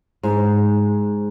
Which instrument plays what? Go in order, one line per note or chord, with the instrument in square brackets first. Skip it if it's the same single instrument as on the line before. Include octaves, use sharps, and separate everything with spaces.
[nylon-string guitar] G#2